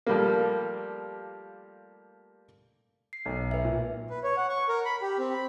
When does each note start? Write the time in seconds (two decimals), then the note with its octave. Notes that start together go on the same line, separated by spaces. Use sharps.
0.07 F3 G3 A3 A#3
3.13 C7
3.26 B1
3.51 B4 E5
3.65 A#2
4.10 B4
4.24 C#5
4.37 F#5
4.50 C#6
4.69 A#4
4.85 B5
5.02 G4
5.18 C4
5.33 B5